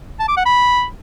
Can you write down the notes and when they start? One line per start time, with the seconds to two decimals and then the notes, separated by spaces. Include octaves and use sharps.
0.20 A5
0.28 D6
0.37 F#5
0.46 B5